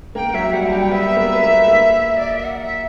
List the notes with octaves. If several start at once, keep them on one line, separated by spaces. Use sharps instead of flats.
A#3 A#4 G5
F#3 F#4 E5
G3 G4 F#5
F#4
A#5
G3 G4 G5
B3 B4 E5
A#3 A#4
B4
A#3 A#4
A#3 A#4
D5
E5
F#5
E5